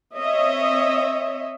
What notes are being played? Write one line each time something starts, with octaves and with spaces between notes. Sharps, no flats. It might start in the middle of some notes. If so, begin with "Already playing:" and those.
C4 C#5 D#5 E5